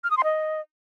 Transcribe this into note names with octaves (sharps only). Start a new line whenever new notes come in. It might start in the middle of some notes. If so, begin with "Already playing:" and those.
F6
D#6
C6
D#5